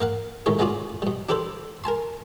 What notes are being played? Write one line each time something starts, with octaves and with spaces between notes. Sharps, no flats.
A#3 F5 F#5
D#2 A2 G#3 A#3 C#5
G#3 B3 C#4 F4 F#4 D5
B2 G3
D4 G4 A4 B4 C5 D5
A#4 G#5 A5 C6